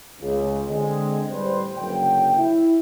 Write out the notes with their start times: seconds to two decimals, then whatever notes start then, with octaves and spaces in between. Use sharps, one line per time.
0.21 C#2
0.68 D3 G#3 C4
1.31 A1 G3 B4 C5
1.77 F#1 F#2 D3 G5
2.37 E4